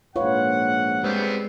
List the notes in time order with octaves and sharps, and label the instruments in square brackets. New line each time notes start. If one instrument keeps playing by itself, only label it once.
[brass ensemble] A#1 G#2 F#5 [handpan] F4 B4 C#5
[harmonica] G3 B3 C4 [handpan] G#3